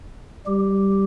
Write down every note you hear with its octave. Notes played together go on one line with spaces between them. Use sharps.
G3 G4